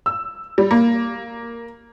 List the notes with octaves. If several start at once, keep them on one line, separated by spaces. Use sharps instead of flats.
E6
G3
A#3